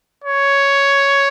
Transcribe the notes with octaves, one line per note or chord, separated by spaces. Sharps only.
C#5